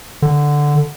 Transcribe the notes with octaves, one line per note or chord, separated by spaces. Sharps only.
D3